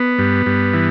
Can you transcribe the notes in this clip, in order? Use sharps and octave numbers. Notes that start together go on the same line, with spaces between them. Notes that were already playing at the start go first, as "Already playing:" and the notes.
Already playing: B3
G2
G2
E3